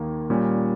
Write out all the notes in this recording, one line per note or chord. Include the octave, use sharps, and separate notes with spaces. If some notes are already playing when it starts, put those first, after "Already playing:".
Already playing: D#2 D#3 A#3 D#4
A#2 G3 C#4